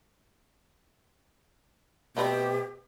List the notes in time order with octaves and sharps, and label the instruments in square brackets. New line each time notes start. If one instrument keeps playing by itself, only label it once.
[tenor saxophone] B2 [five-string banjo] A3 B3 C4 [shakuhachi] G4